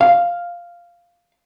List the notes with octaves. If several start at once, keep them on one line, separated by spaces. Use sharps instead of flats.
F5